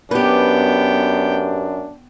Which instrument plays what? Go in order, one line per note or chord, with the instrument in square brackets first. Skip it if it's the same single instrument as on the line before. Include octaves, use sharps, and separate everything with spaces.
[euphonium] F#2 [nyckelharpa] B3 G5 [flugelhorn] D4 [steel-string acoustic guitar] G4 B4